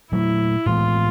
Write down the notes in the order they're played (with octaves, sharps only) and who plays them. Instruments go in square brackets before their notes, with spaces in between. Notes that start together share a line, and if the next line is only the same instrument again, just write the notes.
[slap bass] A#2 F#3 A3 [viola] E4
[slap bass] A2 E3 G#3 B3 [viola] F4